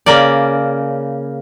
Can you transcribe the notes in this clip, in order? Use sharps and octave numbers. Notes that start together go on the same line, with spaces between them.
C#3 A#3 D5